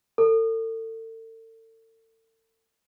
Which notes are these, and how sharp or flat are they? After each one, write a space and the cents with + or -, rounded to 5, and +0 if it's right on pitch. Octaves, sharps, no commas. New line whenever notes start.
A4 +40